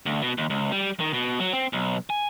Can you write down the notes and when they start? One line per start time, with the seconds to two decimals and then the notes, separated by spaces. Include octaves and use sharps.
0.06 D2
0.22 B2
0.38 D#2
0.50 C#2
0.72 G3
1.00 D#3
1.13 B2
1.40 F#3
1.53 C4
1.73 B1
2.10 G#5